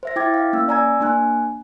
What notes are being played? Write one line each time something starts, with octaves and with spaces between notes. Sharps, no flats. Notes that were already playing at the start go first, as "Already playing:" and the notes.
C5 E5 A#6
E4 E5 G5 D6 G#6 A6
F5
A#3 C#4 E6
D5 G#5 A#5 E6 G#6
A#3 D4 G#5 F#6